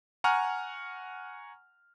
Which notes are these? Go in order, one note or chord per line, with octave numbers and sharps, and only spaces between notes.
F#5 G#5 A#5 C#6 F6